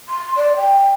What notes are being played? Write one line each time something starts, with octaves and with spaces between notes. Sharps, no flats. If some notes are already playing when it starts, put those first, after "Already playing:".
C6
D5
G5